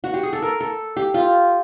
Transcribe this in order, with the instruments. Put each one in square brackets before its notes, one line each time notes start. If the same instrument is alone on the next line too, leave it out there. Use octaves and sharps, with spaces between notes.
[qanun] F#4
G4
G#4
A4
A#4
A4
G4
F4